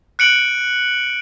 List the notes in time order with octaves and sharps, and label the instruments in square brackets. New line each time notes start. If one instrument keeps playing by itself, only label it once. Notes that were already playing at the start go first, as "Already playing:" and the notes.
[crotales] F#6 C#7 D7 F#7